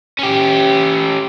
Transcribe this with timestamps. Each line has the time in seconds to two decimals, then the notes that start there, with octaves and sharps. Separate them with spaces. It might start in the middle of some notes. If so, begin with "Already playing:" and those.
0.19 C#4 G4